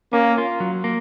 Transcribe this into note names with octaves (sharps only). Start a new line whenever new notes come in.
A#3 C#4
F4
F#3
A#3